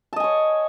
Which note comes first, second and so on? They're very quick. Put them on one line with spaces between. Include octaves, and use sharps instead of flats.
A5 D#5 G#5 C#5